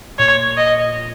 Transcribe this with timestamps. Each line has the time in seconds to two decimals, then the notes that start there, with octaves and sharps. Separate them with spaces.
0.19 A#2 C#5
0.57 D#5